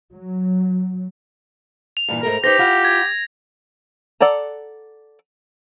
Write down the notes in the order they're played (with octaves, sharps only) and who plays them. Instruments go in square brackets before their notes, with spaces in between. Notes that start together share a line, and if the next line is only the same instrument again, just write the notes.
[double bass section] F#3
[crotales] F7
[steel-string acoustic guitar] G2 A#2 E3
[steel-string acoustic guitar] G#2 A3 A#4 [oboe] A#5
[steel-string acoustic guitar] D#4 B4 C5 [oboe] G4 [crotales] A#6
[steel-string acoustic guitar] E4 F4 F#5
[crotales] G#6
[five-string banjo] A4 D5 F#5 A5 A#5